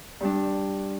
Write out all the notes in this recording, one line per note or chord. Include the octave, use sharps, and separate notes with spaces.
G2 G3 D4